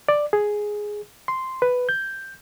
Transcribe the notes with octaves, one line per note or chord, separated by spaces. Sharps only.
D5
G#4
C6
B4
G6